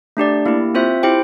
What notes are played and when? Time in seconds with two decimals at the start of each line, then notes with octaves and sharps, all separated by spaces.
0.17 A3 D4 G4 D5
0.46 A#3 E4 G4
0.74 C4 F4 C5 E5
1.03 E4 G4 C5 G5